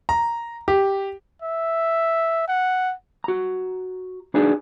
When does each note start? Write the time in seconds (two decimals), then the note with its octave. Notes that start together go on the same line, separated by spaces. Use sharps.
0.09 A#5
0.68 G4
1.42 E5
2.48 F#5
3.24 F#4 A#5
4.34 D4 D#4 F#4 G#4 B4 D5